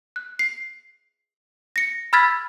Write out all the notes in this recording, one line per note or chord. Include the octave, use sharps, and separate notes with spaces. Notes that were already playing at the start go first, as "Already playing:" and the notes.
F#6
C7
A#6 C#7
B5 E6 F6 G#6 A6 B6